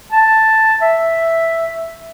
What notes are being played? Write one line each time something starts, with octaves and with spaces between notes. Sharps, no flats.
A5
E5